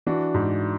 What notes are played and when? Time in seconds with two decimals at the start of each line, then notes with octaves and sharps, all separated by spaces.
0.06 E3 D4 F#4
0.34 G#2